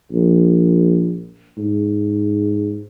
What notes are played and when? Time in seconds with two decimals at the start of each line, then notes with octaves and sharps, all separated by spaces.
0.12 A#1
1.58 G#2